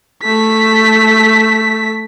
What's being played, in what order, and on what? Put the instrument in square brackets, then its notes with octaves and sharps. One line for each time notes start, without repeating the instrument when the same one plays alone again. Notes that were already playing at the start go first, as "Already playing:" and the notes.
[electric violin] A3 B6